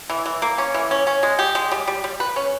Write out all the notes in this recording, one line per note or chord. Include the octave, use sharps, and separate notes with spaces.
E3
E3
A#3
C#4
E3
C#4
C#4
G#3
G4
G#3
G3
G3
G3
B4
C#4